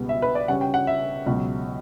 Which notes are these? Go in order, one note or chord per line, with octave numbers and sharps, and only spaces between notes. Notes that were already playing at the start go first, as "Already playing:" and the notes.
Already playing: C#2 B2 G3 B3
E5
B4
D5
C#3 G3 C#4 F#5
G5
F#5
E5
C#2 B2 F#3